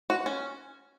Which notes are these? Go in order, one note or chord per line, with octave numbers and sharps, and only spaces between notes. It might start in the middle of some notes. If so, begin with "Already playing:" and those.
F#4
C#4